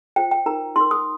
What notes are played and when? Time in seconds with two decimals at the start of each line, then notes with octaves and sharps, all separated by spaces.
0.16 F4 C5 G5
0.31 G5
0.46 D#4 A#4 A#5
0.76 D#4 A#4 C6
0.91 D#6